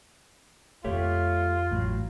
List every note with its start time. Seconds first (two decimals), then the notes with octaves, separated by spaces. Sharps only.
0.84 F2 B2 A3 F4 G4 C#5
1.72 A1 A2 F#3